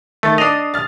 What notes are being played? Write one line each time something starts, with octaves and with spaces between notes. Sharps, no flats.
D#3 A3 A6
D4 D#5 D#6 C7 F7
F6 A6